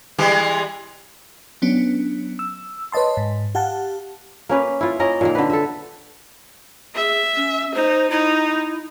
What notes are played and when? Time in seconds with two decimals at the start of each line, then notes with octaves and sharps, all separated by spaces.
0.18 E3 G3 G#3
1.62 F#3 B3 C#4 D4
2.39 E6
2.92 B4 C#5 D#5 A5 C6
3.17 G#2
3.55 G4 F5 F#5 A5
4.49 A#3 C#4 B4
4.81 E4 F4
4.99 A#3 C#4 A#4 D#5
5.21 A#2 D#3 A#3
5.35 D3 B4
5.50 A4 E5
6.95 G#4 E5
7.36 C#4
7.75 D#4 C5
8.10 D#4 E4